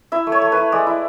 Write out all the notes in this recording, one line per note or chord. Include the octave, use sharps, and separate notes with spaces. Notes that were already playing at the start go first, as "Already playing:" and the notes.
E4 E5
A3
C#5
A3
B4
E4
G#3 D5
E4